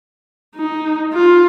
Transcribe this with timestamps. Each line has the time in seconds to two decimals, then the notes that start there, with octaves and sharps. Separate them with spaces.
0.56 D#4
1.14 F4